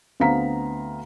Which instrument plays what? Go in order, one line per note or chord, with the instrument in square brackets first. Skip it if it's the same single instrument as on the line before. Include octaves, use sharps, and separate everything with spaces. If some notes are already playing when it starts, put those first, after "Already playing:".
[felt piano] D2 B3 C4 F5 A#5 B6